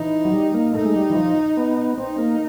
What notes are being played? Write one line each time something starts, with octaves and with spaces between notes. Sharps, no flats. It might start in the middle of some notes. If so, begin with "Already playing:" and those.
Already playing: E3 D#4
F#3
G3
A#3
A3 D#4
G#3
G3
E3
F3
B3
C4 D#4
A#3